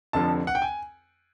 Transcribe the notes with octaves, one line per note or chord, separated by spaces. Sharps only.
F1 F2 D3 F3 A5
F#5
G5
G#5